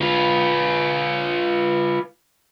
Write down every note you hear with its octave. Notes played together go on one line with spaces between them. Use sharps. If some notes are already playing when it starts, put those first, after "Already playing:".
F4 B4